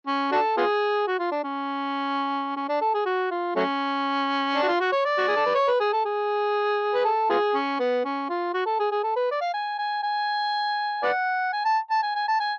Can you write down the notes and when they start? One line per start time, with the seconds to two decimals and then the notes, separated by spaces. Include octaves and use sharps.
0.07 C#4
0.32 D4 F#4 A4
0.57 B3 F4 G#4
1.07 F#4
1.19 F4
1.31 D4
1.44 C#4
2.56 C#4
2.69 D4
2.81 A4
2.94 G#4
3.06 F#4
3.31 F4
3.56 F#3 A3 C#4
4.56 D4
4.62 F#4
4.68 F4
4.80 F#4
4.92 C#5
5.05 D5
5.18 F#4
5.28 G#4
5.36 A4
5.46 B4
5.55 C#5
5.68 B4
5.80 G#4
5.93 A4
6.05 G#4
6.94 B4
7.05 A4
7.30 B3 F4 G#4
7.54 C#4
7.80 B3
8.05 C#4
8.29 F4
8.54 F#4
8.66 A4
8.80 G#4
8.92 G#4
9.03 A4
9.16 B4
9.31 D5
9.41 F5
9.54 G#5
9.79 G#5
10.03 G#5
11.03 B4 D5 F#5
11.53 G#5
11.65 A5
11.91 A5
12.03 G#5
12.15 G#5
12.28 A5
12.40 G#5